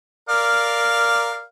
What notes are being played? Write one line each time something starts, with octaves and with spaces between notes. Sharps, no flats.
A#4 D5 F5